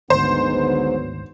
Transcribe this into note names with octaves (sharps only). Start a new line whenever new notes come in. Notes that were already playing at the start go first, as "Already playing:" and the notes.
G#1 D2 G#2 D3 F#3 B3 C5